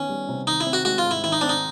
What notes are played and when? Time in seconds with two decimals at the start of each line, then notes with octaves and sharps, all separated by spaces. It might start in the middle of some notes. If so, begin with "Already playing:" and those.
Already playing: D#3 B3 C#4
0.09 G3
0.29 C3
0.47 D#3 D#4
0.61 E4
0.66 C4
0.73 F#4
0.85 G#3 F#4
0.98 F4
1.05 G#2
1.11 E4
1.24 D#3 E4
1.32 D#4
1.41 C4 D4
1.49 D#4